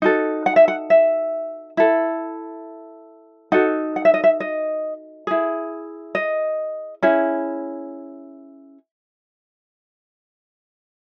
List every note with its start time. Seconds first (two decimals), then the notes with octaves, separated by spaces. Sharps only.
0.02 D#4 F#4 A4
0.46 F#5
0.56 E5
0.68 F#5
0.90 E5
1.77 E4 A4
3.52 D#4 F#4 A4 F#5
3.96 F#5
4.05 E5
4.14 D#5
4.24 E5
4.40 D#5
5.27 E4 G#4
6.15 D#5
7.02 C#4 E4 G#4